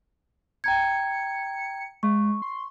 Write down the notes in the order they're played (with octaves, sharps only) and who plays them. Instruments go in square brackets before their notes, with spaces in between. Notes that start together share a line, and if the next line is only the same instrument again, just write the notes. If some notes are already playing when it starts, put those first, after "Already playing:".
[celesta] G5 A#5 G#6 [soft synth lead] C#7
[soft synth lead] G#3 [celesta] C#6
[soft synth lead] C6